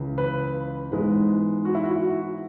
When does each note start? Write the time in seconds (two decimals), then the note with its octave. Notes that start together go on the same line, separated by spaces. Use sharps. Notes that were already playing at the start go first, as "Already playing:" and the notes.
Already playing: C#2 C#3 E3
0.18 B4
0.91 G#2 E3 G#3 B3 B4
1.65 F#4
1.75 E4
1.84 F#4